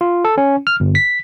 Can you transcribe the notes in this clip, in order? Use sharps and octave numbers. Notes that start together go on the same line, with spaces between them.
F4
A4
C#4
F6
G1
B6